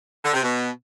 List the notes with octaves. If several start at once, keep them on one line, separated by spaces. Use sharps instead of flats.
D3
C3
B2